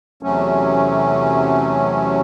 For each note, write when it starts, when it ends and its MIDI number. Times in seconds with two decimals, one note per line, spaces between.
0.23 2.21 40
0.23 2.21 48
0.23 2.21 54
0.23 2.21 57
0.23 2.21 61